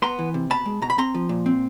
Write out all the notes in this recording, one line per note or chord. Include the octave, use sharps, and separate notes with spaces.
B3 A#5 C6
E3
C3
B2 A5 B5
G#3
B2 A#5
B5
C4 A#5 C6
F3
A#2
C4